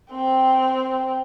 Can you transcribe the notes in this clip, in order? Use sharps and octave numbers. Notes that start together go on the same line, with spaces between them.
C4 G5